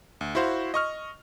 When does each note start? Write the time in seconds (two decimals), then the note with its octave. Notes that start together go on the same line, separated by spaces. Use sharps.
0.21 D2
0.35 E4 F#4 C5 F5
0.74 D#5 C#6 F6